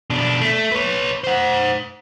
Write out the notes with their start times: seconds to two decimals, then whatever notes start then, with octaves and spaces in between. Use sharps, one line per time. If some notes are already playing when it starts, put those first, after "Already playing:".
0.10 B2 D4
0.41 A3
0.72 B4 C#5
1.24 C5 F#5